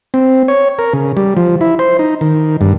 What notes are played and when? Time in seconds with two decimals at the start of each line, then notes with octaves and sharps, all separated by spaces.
0.14 C4
0.48 C#5
0.79 A#4
0.93 C#3
1.17 G3
1.37 F3
1.61 E4
1.79 C5
1.99 D#4
2.21 D#3
2.61 G2